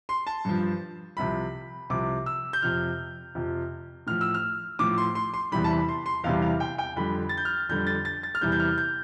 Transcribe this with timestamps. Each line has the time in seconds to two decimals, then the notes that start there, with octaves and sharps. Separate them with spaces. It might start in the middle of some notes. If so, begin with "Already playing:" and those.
0.09 C6
0.27 A5
0.45 G2 F3
1.17 C2 C3 F3 B5
1.90 C2 C3 F3 D6
2.26 E6
2.53 G6
2.62 F2 C3 F3 F6
3.35 F2 C3 F3
4.07 A2 F3 F6
4.21 E6
4.34 F6
4.79 A2 F3 D6
4.98 C6
5.15 C6
5.34 C6
5.52 E2 C3 E3 G3 B5
5.64 A5
5.70 B5
5.89 C6
6.06 C6
6.24 E2 C3 E3 G3 F5
6.42 F5
6.60 G5
6.78 G5
6.96 F2 D3 G3 B5
7.29 A6
7.37 G6
7.45 F6
7.69 F2 D3 G3 G6
7.87 A6
8.05 A6
8.23 A6
8.35 F6
8.41 E2 C3 E3 G3 G6
8.52 G6
8.60 F6
8.78 G6